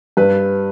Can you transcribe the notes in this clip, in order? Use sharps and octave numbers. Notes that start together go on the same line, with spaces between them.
G2 B4